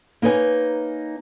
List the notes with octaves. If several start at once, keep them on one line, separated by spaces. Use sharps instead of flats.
A#3 D#4 B4 C#5 G#5